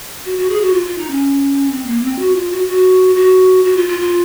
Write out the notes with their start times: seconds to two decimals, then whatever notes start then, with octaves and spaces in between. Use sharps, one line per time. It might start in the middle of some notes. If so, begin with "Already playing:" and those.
0.25 F#4
0.37 F#4
0.49 G#4
0.61 F#4
0.73 F4
0.86 F4
0.98 D#4
1.10 C#4
1.70 C4
1.86 A#3
2.03 C4
2.19 F#4
2.35 F4
2.51 F#4
2.67 F#4
3.15 F#4
3.64 F#4
3.76 F4
3.88 F4
4.00 F4